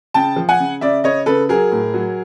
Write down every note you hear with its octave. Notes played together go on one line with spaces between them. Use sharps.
C#3 G5 A5
F3
F#5 G#5
C#3
C#3 D5 E5
C#3 C#5 D#5
C#3 A4 B4
F#3 G#4 A#4
A2
F#3